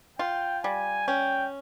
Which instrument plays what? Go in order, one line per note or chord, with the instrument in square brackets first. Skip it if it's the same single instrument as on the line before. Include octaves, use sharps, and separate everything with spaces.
[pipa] F4 [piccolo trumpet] G5
[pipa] G3 [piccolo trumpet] G#5
[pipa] C#4 [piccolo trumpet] G5